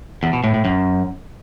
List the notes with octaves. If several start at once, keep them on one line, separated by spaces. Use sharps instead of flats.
E2
B2
A2
A2
F#2